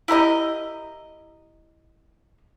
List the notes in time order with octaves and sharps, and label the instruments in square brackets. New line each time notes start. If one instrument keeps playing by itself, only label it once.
[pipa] E4 G4 A#4 D#5